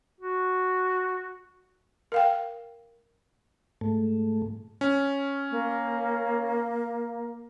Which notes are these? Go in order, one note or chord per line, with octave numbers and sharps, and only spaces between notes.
F#4
A#4 F5 G5
G#2 A3
C#4
A#3